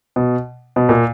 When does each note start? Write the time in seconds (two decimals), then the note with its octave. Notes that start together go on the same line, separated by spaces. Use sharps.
0.16 B2
0.76 B2
0.89 A#2